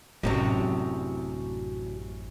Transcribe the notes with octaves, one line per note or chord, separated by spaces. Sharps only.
A1 F#2 A2 C3 F#3 D4